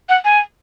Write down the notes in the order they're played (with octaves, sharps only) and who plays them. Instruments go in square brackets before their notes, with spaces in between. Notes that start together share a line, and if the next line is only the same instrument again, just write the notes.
[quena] F#5
G#5